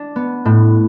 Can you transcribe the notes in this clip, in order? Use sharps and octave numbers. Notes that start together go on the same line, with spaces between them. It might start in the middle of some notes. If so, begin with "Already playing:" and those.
Already playing: D4
B3
A2